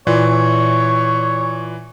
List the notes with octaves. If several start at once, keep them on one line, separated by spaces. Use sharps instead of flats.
A#2 E3 C#5